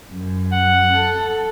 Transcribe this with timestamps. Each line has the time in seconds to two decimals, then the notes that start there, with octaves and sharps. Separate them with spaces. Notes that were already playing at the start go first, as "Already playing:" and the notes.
0.12 F#2
0.52 F#5
0.93 A4